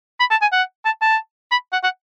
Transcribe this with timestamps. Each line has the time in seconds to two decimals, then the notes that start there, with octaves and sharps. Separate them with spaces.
0.20 B5
0.31 A5
0.42 G#5
0.52 F#5
0.85 A5
1.02 A5
1.51 B5
1.73 F#5
1.84 F#5